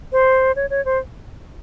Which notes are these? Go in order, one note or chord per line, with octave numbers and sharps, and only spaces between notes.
C5
C#5
C#5
C5